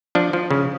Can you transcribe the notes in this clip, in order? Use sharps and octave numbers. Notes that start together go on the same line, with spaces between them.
F3 D4
F3
C#3